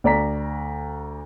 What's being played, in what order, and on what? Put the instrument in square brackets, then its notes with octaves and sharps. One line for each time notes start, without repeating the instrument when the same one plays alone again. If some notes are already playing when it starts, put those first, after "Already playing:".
[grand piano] D2 D5 A#5 B6